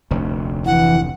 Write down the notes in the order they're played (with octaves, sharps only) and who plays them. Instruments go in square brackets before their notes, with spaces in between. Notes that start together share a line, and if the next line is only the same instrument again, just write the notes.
[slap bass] F1 D2
[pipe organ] E3 [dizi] F#5